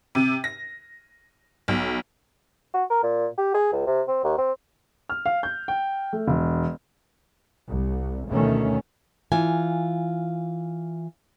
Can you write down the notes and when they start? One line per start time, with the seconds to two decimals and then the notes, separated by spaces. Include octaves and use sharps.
0.15 C3
0.44 A#6
1.68 B1
2.74 F#4
2.90 A#4
3.03 A#2
3.38 G4
3.55 G#4
3.73 C#2
3.87 C3
4.08 C4
4.24 D#2
4.38 C4
5.09 F6
5.26 F5
5.43 G6
5.68 G5
6.13 A3
6.28 E1
7.68 C2
8.29 D2 B2 D#3 A3 C#4
9.32 E3 F4 G#5